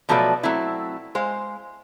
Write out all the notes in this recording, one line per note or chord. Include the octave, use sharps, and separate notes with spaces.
B2 F3 F#3 A3 B4 D5
F#3 A3 C4 E4
G#3 C5 F5